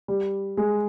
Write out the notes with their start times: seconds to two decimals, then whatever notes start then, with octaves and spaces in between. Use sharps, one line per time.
0.08 G3
0.57 G#3